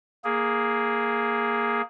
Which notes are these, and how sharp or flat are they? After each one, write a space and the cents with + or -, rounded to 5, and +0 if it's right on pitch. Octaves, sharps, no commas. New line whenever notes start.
A#3 +0 G#4 +0